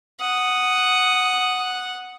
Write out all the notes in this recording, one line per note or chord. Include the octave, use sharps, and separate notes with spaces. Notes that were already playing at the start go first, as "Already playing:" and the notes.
F#5 D#6